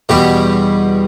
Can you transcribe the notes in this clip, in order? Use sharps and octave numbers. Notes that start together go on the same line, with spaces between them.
E2 B2 G3 G4